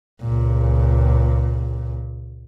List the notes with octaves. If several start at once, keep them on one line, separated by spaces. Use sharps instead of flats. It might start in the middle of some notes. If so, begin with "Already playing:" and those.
C#2 A#2